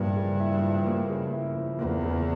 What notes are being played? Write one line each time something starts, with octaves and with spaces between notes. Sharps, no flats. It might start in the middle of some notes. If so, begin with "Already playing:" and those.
Already playing: G2 C#3 F3 A#3 E4
C#3
E4
F3
A#3
C#3
E4
F3
E2 A#3
C#3